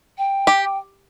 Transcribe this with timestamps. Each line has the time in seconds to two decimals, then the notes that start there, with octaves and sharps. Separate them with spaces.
0.18 G5
0.47 G4